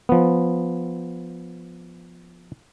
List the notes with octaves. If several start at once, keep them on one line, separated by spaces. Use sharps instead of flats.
F3 B3